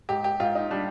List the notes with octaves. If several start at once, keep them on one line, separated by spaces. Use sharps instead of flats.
G#2 G4
G4
G#2 F4
D#4
G3 D4